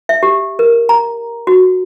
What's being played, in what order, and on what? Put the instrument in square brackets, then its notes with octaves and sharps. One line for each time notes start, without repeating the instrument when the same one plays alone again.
[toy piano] E5
G4
A#4
A#5
F#4